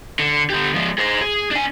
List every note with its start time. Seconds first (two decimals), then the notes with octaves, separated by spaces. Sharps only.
0.19 D3
0.50 D3 G4
0.74 F3 G#3
0.98 G#4 C5
1.22 G#4
1.51 D4 G#5